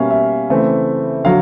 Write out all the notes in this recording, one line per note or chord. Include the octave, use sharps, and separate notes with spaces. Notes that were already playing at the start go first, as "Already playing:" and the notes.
Already playing: B2 G3 A#3 C#4 E5 F5
E5
C#3 E3 A3 C4
D3 F#3 F5